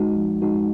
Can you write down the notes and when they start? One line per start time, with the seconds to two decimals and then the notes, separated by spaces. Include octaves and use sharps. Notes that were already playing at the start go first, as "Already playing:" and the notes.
Already playing: G#3 D#4 F#4
0.16 F3
0.42 G#3 D#4 F#4